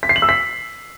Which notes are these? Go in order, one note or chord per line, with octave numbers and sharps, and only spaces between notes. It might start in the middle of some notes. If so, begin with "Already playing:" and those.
B6
C7
F#7
E6
B6